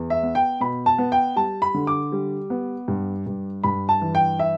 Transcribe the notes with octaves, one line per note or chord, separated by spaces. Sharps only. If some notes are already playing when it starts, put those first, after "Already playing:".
Already playing: E2
E5
B3
G5
B2 B5
A5
B3
G5
G3 A5
B5
D3
D6
G3
B3
G2
G2
G2 B5
A5
E3
G5
E5